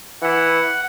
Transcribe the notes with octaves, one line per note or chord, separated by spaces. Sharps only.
E3 F#5